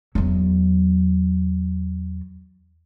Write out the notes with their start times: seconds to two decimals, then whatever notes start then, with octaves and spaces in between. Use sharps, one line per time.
0.15 E2 F#3